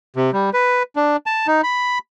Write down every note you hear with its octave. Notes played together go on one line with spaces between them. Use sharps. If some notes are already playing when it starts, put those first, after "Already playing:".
C3
G3
B4
D4
A5
D#4
B5